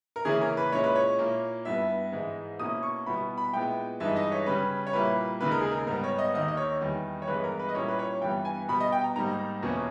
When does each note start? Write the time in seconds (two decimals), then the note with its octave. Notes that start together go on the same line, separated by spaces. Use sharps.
0.16 A#4
0.25 C#3 E3 A#3 C#4 E4 G#4
0.41 A#4
0.57 B4
0.72 A#2 G#3 C#4 E4 C#5
0.84 B4
0.96 C#5
1.19 A#2 A#3 E4
1.65 G2 G3 B3 E4 E5
2.12 G#2 E3 G#3
2.60 B2 A#3 C#4 E4 D#6
2.83 C#6
3.06 B2 G3 B3 E4 B5
3.38 B5
3.53 A#2 G#3 B3 E4 G5
4.00 G2 E3 G#3 D#4 E5
4.16 D#5
4.32 C#5
4.46 C#3 G3 C#4 B4
4.87 C#5
4.93 A#2 G3 A#3 E4 B4
5.41 D#2 C#3 G#3 D#4 B4
5.51 A#4
5.61 G#4
5.71 A#4
5.87 G#2 G3 B3 A#4
6.04 C#5
6.19 D#5
6.34 D#2 D#3 A#3 D#5
6.48 D#5
6.57 C#5
6.81 E2 D#3 G3
7.22 C#5
7.27 G2 E3 G#3 B3 E4 B4
7.44 A#4
7.59 B4
7.69 D#5
7.75 A#2 G3 A#3 C#4 E4 C#5
7.88 B4
7.99 C#5
8.22 G2 E3 G3 B3 G5
8.45 G#5
8.68 B2 G3 B3 B5
8.81 D#5
8.92 G5
9.04 A#5
9.15 G#2 G3 A#3 D#4 A#5
9.62 E2 B2 A#3 C#4